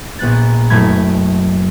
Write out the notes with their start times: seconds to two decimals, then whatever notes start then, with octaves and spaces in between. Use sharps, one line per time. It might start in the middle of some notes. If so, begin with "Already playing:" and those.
0.19 A#1 B3 F#6 A6
0.70 F#1 B2 A3 B5 G#6